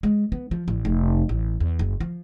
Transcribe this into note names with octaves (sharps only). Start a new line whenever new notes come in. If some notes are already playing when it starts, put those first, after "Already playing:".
G#3
B3
F3
A1
F1
A1
E2
F#1
F3